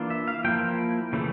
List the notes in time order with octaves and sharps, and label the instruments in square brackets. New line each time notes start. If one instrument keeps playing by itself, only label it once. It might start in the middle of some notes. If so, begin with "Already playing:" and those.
Already playing: [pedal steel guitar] E3 A#3 D4 F4
E5
F5
F3 A#3 E4 G5
C#3 E3 A3